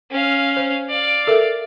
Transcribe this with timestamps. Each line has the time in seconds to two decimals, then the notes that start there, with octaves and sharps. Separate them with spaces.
0.11 C#4 F5
0.57 C5
0.89 D5 F5
1.27 A4 A#4 E5